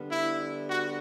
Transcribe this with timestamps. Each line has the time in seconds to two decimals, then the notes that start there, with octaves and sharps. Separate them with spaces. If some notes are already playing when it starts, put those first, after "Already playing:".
Already playing: D3 G3 B3
0.11 E4
0.69 F#4